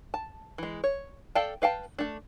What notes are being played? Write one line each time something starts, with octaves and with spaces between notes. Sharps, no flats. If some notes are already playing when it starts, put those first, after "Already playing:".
A5
E3 G#3
C#5
A4 D5 F5 G5 A5
B4 F5 G5 A5
A3 D4